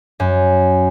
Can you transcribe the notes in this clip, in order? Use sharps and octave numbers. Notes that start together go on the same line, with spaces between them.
F#2